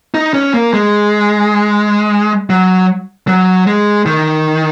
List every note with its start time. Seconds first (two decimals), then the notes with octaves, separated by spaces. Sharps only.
0.14 D#4
0.34 C#4
0.54 A#3
0.74 G#3
2.50 F#3
3.28 F#3
3.67 G#3
4.06 D#3